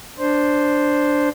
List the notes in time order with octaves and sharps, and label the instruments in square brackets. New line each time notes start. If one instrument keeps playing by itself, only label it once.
[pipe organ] D4 C5